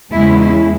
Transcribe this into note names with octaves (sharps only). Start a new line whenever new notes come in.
E2 C#3 G#3 E4
E4